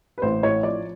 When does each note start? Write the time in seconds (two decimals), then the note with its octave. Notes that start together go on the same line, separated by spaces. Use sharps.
0.18 B4
0.22 A1 C5
0.43 A2 C#5
0.63 F3 D5